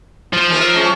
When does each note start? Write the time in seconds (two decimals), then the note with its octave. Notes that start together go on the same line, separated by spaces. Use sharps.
0.33 F3
0.48 D#2 C#4 A#4
0.60 A#4 E5
0.74 G#3 C#4